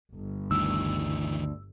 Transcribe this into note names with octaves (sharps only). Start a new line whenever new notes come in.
G1
D2 D#3 E3 E6